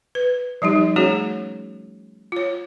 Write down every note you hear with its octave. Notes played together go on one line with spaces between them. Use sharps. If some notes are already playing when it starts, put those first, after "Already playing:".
B4
F3 G3 D#4 G4
A3 C#4 F#4 G#4 C#5
F4 C#5